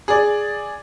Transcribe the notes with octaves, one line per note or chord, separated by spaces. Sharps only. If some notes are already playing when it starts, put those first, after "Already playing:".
G#4 D5